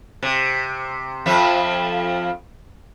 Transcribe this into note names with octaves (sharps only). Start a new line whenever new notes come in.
C3
F2 F3 E5